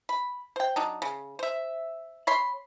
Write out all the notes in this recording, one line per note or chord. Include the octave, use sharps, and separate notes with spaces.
B5
C5 G5
F#3 D4 D#4
C#3
C5 E5
C#5 B5 C6